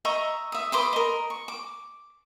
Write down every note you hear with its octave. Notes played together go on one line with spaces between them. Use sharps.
D#5 E5 A#5 C#6
E5 D#6
B4 C6 D6 D#6
A#4 D#5
C#6
D6